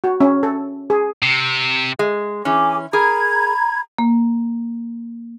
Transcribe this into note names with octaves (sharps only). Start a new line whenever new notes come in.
F#4
C#4
A4
G#4
C3
G#3
E3 C#4 G#4 G#5 D6
G#4 A#4 A#5 B5 G#6
A#3